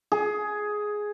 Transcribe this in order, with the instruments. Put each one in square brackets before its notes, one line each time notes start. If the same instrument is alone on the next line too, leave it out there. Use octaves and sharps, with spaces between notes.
[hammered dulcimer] G#4